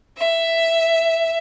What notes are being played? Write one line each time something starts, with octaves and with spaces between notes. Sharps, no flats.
E5